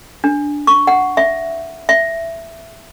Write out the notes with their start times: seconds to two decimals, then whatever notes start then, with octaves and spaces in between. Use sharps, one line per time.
0.24 D4
0.67 C#6
0.87 F#5
1.17 E5
1.89 E5